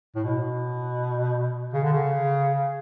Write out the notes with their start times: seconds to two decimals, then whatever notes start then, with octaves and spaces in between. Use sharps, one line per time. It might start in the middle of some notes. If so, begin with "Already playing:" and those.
0.15 A2
0.24 B2
1.73 C#3
1.83 D3
1.93 C#3